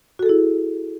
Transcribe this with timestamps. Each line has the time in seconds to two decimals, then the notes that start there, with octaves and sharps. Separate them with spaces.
0.19 F#4
0.23 A4
0.26 G#4
0.29 E4